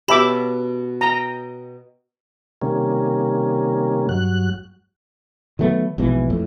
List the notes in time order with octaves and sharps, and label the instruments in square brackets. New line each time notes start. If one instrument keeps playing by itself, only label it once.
[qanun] B2 C#4 [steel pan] G4 E5 D6 [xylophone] A5 B5
[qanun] D#5 G5 [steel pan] A#5
[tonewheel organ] C3 D#3 G3 A#3 C#4
G2 F#3 F#6
[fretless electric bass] D#3 F#3 A3 B3
A#1 G#2 B2 E3
F2 A2